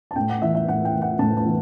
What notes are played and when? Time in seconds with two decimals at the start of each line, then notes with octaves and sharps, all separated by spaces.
0.11 A5
0.16 A2 G5
0.29 F#5
0.42 E3 E5
0.55 E5
0.68 A2 F#5
0.85 G5
0.93 E3
1.02 F#5
1.19 A2 A5
1.37 A5
1.45 E3